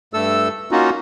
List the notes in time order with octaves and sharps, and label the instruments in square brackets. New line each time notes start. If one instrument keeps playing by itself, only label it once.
[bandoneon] G2 A3 A4 E6
A#3 C#4 D#4 F4 F#4